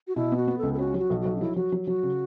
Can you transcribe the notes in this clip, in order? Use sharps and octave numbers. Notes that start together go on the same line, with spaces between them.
F#4
B2 E4
B3
F#4
B3
C#2 A4
A4
C#4 F#4
F#3 F#4
B1
B1 F#4
C#4
F#3 E4
F#3 F#4
F#3
F#3 F#4
C#3